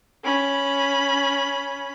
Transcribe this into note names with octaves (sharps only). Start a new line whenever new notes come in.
C#4 B5